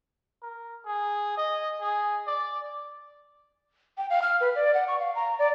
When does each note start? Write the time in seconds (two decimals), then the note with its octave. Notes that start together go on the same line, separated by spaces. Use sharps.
0.43 A#4
0.86 G#4
1.37 D#5
1.81 G#4
2.27 D5
3.98 G5
4.10 F5
4.22 F6
4.41 B4
4.55 D5
4.74 F#5
4.88 C#6
4.99 F5
5.15 A#5
5.39 D5